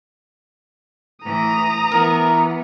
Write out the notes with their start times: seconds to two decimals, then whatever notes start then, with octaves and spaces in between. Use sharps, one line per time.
1.25 A2 E3 A#5 D#6
1.92 E3 B3 A#4